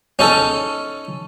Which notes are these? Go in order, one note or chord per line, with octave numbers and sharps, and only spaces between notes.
C#4 D#4 A4